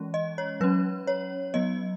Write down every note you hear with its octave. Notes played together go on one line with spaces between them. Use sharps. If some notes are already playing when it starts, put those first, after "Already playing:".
Already playing: E3 G#3 C#4
D#5
C#5
F#3 C#4 B4
C#5
F#3 B3 D#5